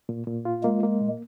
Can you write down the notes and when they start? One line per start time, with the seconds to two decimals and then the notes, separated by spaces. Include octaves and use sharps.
0.09 A#2
0.27 A#2
0.45 F4
0.64 G#3 A#3
0.83 A#3
1.01 A#2